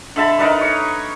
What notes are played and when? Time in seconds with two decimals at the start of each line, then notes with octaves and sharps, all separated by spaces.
0.16 D3 E5 A5 B5
0.39 D#4 A#4 B4 D5
0.61 C#5